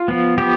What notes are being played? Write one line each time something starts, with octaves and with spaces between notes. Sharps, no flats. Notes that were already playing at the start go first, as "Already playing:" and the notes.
Already playing: F4
F3 B3
F3 B3 G4